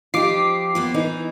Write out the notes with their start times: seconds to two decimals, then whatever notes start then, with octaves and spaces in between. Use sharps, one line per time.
0.14 F3 D#4 F4 G4 D6 C7
0.75 F3 A#3 B3
0.94 E3 D#4